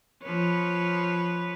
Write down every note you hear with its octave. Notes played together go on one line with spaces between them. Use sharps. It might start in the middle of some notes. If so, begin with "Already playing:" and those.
F3 B4 C#5